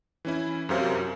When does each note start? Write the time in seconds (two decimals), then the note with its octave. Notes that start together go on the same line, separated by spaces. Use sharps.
0.25 E3 C#4 E4
0.69 F#2 C3 F#3 A#3